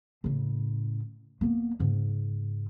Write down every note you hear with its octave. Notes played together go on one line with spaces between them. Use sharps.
A2 C#3
A#3 B3
G#2 C#3